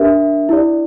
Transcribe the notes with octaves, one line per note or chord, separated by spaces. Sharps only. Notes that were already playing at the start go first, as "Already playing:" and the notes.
Already playing: D4 G4 A#4 E5
E4 G4 D5